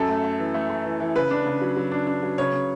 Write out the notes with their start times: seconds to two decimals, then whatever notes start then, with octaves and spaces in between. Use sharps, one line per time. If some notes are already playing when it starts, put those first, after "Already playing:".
Already playing: F#2 A4
0.08 A3
0.24 A3
0.39 E3
0.54 A3
0.69 A3
0.85 E3
1.00 E3
1.16 C#3 B4
1.31 D4
1.46 C#3
1.61 F#3
1.76 F#3
1.92 D4
2.07 D4
2.22 F#3
2.38 C#3 C#5
2.53 C#3